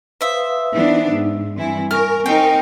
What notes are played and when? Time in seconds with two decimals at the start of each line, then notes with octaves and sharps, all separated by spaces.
0.21 B4 C5 E5 F5 D#6
0.73 E3 B3 D4 D#4
1.11 G#2
1.56 G2 E3 C4 E4 G#5
1.91 A#4 G#5 C#6 F6
2.26 C4 D#4 A#4 G5